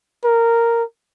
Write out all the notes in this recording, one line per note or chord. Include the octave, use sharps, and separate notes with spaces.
A#4